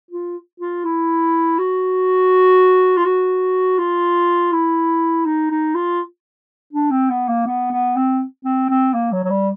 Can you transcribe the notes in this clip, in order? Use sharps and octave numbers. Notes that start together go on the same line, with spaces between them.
F4
F4
E4
F#4
F4
F#4
F4
E4
D#4
D#4
F4
D4
C4
B3
A#3
B3
B3
C4
C4
C4
A#3
F#3
F#3
G3